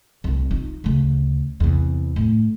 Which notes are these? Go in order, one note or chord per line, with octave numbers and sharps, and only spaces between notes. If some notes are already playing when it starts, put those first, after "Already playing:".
C2 A#2
D#4 F4
D2 C#3
E2 C3
A2